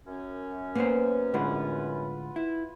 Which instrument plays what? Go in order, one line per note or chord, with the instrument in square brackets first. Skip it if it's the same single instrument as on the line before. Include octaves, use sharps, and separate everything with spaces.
[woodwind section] F#2 C#4
[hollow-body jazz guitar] A#3 C5 [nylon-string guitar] B3 C#5
[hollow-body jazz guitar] A2 D3 G#3 [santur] F4 B4 F#5
[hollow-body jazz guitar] E4